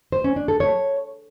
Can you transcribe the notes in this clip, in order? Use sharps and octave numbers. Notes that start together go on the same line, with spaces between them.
C5
C#4
D4
A4
C#5